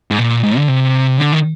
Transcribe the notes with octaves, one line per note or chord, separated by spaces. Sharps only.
G#2
A#2
G#2
D3
C3
D3
D#3